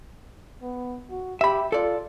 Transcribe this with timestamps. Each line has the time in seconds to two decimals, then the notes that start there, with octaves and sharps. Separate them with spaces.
0.62 B3
1.10 F#4
1.41 G4 E5 B5
1.72 F4 A4 D5